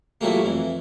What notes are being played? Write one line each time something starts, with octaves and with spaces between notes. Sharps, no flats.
A#2 E3 F#3 G3 A3 A#3
F2 E3